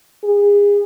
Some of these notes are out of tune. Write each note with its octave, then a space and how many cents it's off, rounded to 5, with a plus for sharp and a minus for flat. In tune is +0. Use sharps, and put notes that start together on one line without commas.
G#4 -30